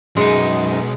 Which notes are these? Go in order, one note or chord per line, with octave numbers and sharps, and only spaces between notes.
B1 F#2 G#3 B3 D#4